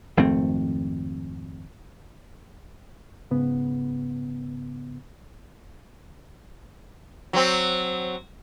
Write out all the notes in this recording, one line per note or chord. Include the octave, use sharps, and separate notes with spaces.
G#1 F2 A3 C4
G#2 C#3 B3
F#3 C4